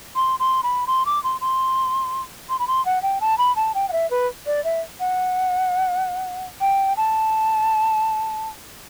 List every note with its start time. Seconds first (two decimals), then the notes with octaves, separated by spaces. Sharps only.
0.16 C6
0.40 C6
0.63 B5
0.87 C6
1.06 D6
1.24 C6
1.41 C6
2.49 C6
2.59 B5
2.68 C6
2.86 F#5
3.02 G5
3.21 A5
3.38 B5
3.56 A5
3.75 G5
3.89 F#5
3.93 E5
4.11 B4
4.46 D5
4.64 E5
5.00 F#5
6.61 G5
6.97 A5